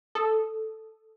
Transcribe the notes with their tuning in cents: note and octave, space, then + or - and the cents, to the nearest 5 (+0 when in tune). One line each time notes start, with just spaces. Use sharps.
A4 +0 D#6 +0